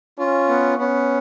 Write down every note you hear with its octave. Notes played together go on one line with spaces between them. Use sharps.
C#4 F4
B3
B3 C#4